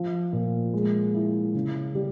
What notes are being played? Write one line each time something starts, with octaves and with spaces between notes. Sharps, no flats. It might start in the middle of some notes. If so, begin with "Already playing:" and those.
Already playing: F3
A#2
G#3
E4
C#3
G3